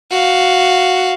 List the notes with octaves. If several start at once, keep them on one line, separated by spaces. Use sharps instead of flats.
F#4 F5